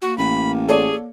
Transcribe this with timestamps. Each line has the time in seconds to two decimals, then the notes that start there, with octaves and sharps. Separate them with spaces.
0.02 A#3 F#4
0.18 A1 B5
0.69 G#4 A4 C#5 D5